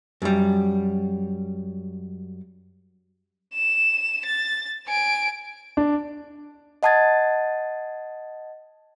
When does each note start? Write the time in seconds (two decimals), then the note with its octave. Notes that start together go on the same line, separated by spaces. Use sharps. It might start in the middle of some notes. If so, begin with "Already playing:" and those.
0.22 F#2 G3
3.54 E7
4.26 A6
4.87 G#5 D7
5.77 D4
6.83 D#5 F#5 A5 D#6 G#6 A6